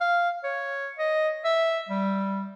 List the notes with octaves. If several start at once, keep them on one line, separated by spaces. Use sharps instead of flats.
F5
C#5
D#5
E5
G3